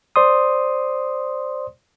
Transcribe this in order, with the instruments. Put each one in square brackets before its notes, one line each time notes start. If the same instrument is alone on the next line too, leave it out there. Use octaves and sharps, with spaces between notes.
[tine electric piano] C5 D5 C6 D#6